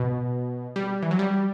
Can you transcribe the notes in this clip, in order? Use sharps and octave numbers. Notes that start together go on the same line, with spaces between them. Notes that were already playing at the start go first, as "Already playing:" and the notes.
Already playing: B2
G3
E3
F#3
G3